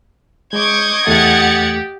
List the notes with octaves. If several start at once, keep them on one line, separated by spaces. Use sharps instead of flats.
G#3 D#5 C#6 D6 G6 G#6
E2 A3 G4 F#5 A6 C#7